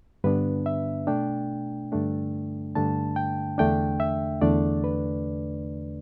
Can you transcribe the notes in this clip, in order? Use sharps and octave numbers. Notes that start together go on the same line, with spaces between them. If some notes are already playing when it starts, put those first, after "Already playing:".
G2 D3 B3 D4 B4
E5
B2 A3 D4 G5
G2 D3 A3 D4
G2 D3 A3 D4 A5
G5
E2 D3 A3 D4 G5
E5
E2 D3 A3 D4 D5
B4